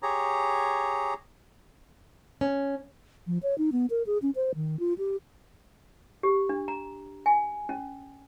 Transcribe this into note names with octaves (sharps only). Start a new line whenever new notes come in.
G4 G#4 C#5 A#5
C#4
F3
C#5
D#4
B3
A#4
G#4
C#4
C5
D#3
F4
G4
G4
D4
A#5
G#5
C#4